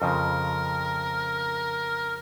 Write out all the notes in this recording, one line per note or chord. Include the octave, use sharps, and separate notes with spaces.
F2 C#3 F3 A#4